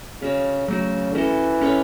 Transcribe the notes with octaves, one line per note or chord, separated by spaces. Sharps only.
C#3 C#4 F#4 C#5
C#3 F#3 A3 F#4
E3 C#4 F#4 A4
C#4 A4 C#5